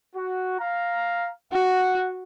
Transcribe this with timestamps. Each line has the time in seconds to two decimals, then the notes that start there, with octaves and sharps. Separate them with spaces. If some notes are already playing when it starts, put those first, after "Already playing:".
0.16 F#4
0.60 F5 A#5
1.53 F#4 F#5